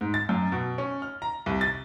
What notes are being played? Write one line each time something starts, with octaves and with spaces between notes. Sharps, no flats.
G#2
A6
F#2
B2
C#4
F6
A#5
C2
A6